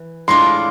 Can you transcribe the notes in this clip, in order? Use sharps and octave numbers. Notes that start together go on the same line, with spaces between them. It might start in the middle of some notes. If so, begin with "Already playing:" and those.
Already playing: E3
A2 G#3 D4 F4 C6